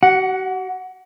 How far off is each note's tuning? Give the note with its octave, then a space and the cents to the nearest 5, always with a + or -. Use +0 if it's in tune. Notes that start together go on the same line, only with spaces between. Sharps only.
F#4 +45 F#5 +0